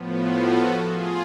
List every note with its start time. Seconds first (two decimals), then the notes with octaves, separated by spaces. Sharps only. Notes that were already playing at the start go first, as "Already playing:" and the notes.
Already playing: A2 F3 B3
0.39 F#4 A4
0.87 F4 G#4